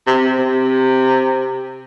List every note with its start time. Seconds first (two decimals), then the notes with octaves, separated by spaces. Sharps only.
0.07 C3
0.39 C3